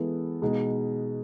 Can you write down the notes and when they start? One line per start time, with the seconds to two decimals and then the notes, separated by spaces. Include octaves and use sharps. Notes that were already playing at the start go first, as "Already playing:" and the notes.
Already playing: E3 G#3 B3 E4 A4
0.42 B2 G#3 D#4